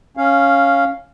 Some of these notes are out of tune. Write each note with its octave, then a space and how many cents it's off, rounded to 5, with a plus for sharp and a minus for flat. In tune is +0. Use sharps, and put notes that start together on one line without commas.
C#4 +0 F5 +0